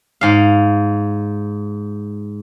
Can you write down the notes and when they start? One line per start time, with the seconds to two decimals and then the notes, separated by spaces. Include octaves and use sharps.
0.21 G#2 F5